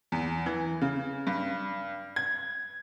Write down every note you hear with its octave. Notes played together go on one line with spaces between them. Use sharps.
E2
E3
C#3
G2
G#6